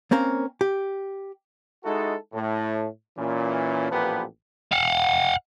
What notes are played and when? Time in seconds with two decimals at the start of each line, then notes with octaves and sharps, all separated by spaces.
0.11 A#3 C4 C#4 A#4
0.61 G4
1.84 G#3 D#4 E4 F#4 A4
2.33 A2
3.17 A#2 E3 C#4
3.90 A1 A#2 F3 B3 G4 B4
4.72 F5 F#5